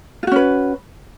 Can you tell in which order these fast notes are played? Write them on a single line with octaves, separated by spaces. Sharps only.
F4 F#4 C#4 B4